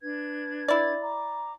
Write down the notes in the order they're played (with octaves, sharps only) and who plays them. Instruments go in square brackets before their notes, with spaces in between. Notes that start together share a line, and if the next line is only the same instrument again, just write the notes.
[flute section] D4 B4 G#6
[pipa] E4 D5
[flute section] A#5 D6